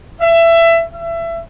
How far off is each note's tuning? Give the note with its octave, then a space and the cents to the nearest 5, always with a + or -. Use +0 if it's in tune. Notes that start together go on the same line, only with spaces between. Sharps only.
E5 +20
E5 +25